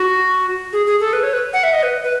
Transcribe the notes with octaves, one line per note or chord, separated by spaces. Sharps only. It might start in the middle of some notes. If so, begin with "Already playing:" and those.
Already playing: F#4
G#4
G#4
A4
B4
C#5
B4
F#5
E5
D#5
B4
B4